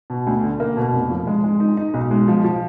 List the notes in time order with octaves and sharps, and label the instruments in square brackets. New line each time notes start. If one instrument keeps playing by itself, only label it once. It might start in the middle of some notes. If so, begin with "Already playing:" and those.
[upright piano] B2
D2
D3
A#3
B2
F1
F3
G#3
G#3
D#4
D#4
B1
G#3
F3
F3